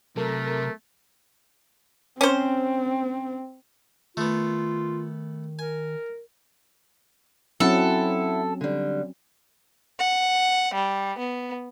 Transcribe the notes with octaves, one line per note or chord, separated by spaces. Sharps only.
C3 F#3 A3 A4 A#4
C4 C#4 C5
D#3 A3 B3 F4
A#4 G#5
F#3 C4 C#4 E4 A4 F#5
D3 G3
F#5
G3
B3